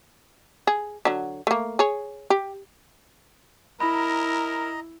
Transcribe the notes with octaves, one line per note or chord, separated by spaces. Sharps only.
G#4
D3 F#3
A3 A#3
G#4 C#5
G4
E4 A#4 D#5 A#5 B5